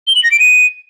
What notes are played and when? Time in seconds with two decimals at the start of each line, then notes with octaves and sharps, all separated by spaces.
0.07 G7
0.15 F#7
0.23 A#6
0.32 D7
0.40 D#7